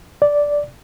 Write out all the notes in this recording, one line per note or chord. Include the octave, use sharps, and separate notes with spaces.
D5